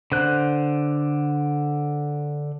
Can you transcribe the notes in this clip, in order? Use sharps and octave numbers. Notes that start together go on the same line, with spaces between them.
D3 C5 F#6